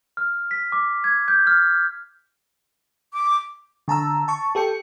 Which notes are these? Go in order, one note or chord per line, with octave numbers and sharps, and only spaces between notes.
F6
B6
D6
G#6
G6
F6
D6
D3 A5 A#5 E6
A5 C#6
G4 A4 G5 C#7